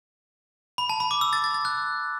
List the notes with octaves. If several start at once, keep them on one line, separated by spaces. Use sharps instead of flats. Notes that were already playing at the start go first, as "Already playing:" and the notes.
B5
A5
B5
D6
E6
A6
A6
A6
F#6